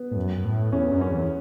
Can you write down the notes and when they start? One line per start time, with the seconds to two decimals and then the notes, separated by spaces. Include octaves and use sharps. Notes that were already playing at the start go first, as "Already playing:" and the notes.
Already playing: B3
0.11 A2
0.16 F#2
0.38 F#2
0.44 A2
0.72 E2 C#4
0.91 F#2
1.01 C#4
1.10 E2